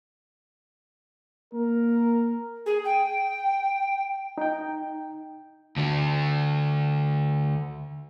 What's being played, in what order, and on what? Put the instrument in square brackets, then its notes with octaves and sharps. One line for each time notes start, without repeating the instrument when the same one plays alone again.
[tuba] A#3 [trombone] A#4
[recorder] G#4
G5
[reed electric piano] D#4 G5
[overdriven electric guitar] D2 D3